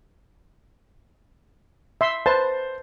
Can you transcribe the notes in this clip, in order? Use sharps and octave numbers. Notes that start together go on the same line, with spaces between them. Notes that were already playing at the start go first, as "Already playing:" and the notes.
E5 C6
B4 C5 A5